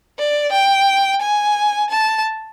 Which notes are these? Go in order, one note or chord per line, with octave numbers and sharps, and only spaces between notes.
D5
G5
G#5
A5